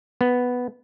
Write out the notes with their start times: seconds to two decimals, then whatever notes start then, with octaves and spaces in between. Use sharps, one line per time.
0.21 B3